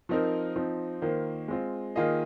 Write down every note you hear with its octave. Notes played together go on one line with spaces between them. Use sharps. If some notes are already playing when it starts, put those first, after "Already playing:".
F3 C4 D#4 A#4
F3 C4 D#4
D#3 A#3 F4 C5
G#3 C4 F4
D#3 A#3 F4 G#4 D#5